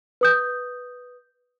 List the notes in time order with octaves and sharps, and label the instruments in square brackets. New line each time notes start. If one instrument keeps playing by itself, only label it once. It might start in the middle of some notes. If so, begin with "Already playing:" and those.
[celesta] B4 D#6 G6